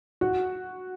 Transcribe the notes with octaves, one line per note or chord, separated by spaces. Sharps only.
F#4